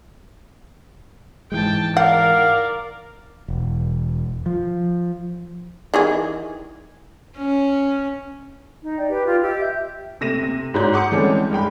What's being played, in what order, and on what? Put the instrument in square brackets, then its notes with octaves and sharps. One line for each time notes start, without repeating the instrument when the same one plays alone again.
[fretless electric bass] G#2 E3 G#3 [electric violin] G5 A5
[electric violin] A#4 D5 [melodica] F5 [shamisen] F#5
[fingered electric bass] E1
F3
[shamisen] D#3 E3 G#4
[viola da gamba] C#4
[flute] D#4
[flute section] D5 G5
[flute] G4 [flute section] B4
[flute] F4 [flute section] G5
[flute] G4 [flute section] D#5 E6
[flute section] E5 G6
[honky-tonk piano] C3 A3 A#6 D#7 E7
C3
G#2 F#4 C#5 D5 G6
F#5 C6 D6 D#6 C#7
E3 G3 G#3 C4 C#4 A4
G2 G#3 G5 B5